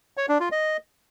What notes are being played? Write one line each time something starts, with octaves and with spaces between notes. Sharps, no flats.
C#5
D4
F4
D#5